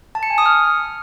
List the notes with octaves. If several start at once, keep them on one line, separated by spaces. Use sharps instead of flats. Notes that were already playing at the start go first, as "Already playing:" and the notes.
A5
C#7
G#5
D#6
F6